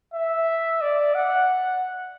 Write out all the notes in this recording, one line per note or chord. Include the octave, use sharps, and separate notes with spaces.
E5
D5
F#5